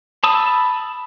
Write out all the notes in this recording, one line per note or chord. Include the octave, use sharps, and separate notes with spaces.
A5 B5 D#6 E6